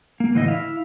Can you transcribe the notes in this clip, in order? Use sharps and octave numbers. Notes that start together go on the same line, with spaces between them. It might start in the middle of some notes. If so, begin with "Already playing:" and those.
A#3
A2 D3 E3 E4 D#5
E4 F5